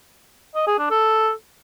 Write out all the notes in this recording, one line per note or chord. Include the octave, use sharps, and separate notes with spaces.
D#5
G#4
D4
A4